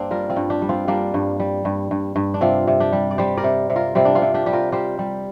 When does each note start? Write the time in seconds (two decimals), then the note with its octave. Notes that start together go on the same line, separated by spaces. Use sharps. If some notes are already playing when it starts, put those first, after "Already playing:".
Already playing: G2 A#3 C4 D4
0.11 G3 F4 A#4
0.29 C4 F4
0.36 G2
0.50 D4 G4
0.62 G3
0.69 C4 F4
0.88 G3 A#3 D4
1.14 G2
1.40 G3
1.65 G2
1.91 G2
2.16 G2
2.34 D4
2.41 C3 C4 F4
2.68 C3
2.80 D4 G4
2.93 G3
3.11 D5
3.18 G3 G4 C5
3.37 A#4 D5
3.44 C3
3.70 C3
3.76 F4 A#4
3.95 C3 G3 C4
4.05 D4
4.15 C4 F4
4.22 C3
4.34 D4 G4
4.46 G3 G4
4.53 F4 A#4
4.72 G3 G4 C5
4.99 G3